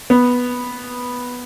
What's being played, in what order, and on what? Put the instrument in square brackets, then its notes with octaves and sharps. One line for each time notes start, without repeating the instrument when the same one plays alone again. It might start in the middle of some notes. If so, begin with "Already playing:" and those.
[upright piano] B3